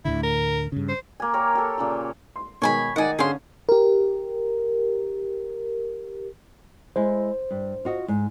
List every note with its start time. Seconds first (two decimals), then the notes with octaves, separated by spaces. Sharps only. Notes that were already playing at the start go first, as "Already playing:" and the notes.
0.05 D2 A2 D3 E4
0.23 A#4
0.72 G2 C#3
0.89 C5
1.20 A#3 G#5
1.33 G4 A#4 C#5
1.55 G4 A4
1.78 A#2 C#3 G4
2.36 C6
2.62 B2 D#3 G#3 C#5 G#5 B5
2.96 D#3 D#4 D5 F#5 G#5
3.19 D3 C#4 G#4 C5 F5 C6
3.69 G4 A#4
6.96 G#3 E4 C5
7.51 G2
7.85 F4 F#4 D#5
8.08 G#2